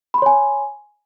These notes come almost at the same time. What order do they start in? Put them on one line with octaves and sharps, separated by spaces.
B5 C6 C#5 G#5